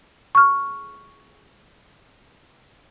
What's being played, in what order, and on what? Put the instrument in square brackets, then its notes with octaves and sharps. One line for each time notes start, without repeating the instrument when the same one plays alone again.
[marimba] C#6 F6